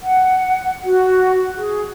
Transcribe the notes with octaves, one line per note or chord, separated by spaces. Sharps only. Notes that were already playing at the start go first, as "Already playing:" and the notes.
F#5
F#4
G#4